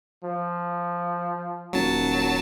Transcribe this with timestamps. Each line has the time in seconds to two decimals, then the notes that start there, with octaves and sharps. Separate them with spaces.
0.24 F3
1.73 D#1 F#3 A5